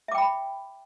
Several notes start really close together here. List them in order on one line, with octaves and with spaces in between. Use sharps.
E5 D6 G5 B5